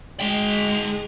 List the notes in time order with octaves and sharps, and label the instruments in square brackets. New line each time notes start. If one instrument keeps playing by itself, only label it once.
[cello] G#3 [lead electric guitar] G#4 G5